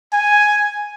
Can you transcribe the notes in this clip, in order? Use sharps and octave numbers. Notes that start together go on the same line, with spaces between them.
G#5